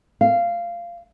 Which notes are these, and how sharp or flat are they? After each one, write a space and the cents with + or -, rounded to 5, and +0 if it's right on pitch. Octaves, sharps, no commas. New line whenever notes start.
F5 -15